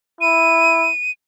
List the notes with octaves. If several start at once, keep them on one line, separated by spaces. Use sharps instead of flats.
E4 D#7